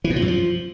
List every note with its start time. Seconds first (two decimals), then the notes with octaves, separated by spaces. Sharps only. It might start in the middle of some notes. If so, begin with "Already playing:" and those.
0.04 E3
0.10 B2
0.16 F3
0.22 F#2
0.28 F3